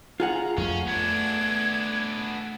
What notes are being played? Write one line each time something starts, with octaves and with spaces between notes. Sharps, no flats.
F4 G#4 F#5 A#5
F2 A3 C#4 F5
A3 B3 D4 G#6